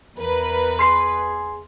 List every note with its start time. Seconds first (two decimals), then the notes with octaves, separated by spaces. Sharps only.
0.18 E2 A#4 B4
0.79 G#4 C6 C7